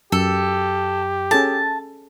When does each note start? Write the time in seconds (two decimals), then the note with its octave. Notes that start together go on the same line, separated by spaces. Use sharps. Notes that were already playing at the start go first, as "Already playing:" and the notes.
0.12 F#2 G4 A4
1.31 C#4 G#4 A4 A5